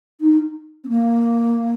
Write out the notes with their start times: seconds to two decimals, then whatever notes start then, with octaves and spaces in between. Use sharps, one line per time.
0.21 D#4
0.84 C4
0.89 A#3